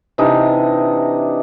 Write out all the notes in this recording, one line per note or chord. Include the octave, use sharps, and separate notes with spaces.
C3 E3 D4 D#4